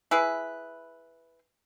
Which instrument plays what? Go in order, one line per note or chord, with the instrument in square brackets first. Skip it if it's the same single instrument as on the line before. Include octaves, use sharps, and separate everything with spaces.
[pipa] E4 G#4 B4